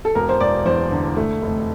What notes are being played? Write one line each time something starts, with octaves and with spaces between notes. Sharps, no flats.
A4
E1 A#4
C5
E1 D5
E2 C5
D3
A3
F1